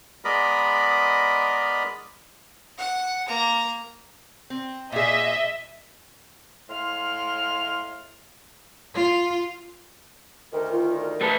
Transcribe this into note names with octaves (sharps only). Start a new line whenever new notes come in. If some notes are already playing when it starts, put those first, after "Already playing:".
G#3 B3 A#4 D5 D#5 B5
F#5
A#3 A#5
C4
A#2 G#4 D#5 E5
A2 G#3 F5 C6 F6
F4
D2 D#3 A#4
F4
A#4
A3 A4 B4 A5